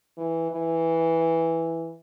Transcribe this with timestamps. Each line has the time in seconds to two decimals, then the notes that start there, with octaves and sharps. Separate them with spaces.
0.17 E3
0.51 E3